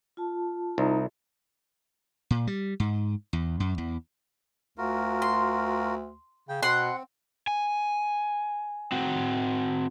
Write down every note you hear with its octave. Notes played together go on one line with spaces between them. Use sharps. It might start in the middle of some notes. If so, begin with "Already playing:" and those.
F4 A5
C2 D#4
A#2
G3
G#2
E2
F#2
E2
D2 F4 F#4 A#4
C6
C#3 G5
B2 C4 F#5 C6
G#5
C4 F#4